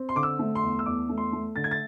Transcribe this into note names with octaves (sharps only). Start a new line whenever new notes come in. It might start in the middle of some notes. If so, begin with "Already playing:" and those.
Already playing: C4
C6
D3 D6
E6
A3
C6
E2
E6
E2 D6
A3
C6
A3
D3 A6
G#6
A6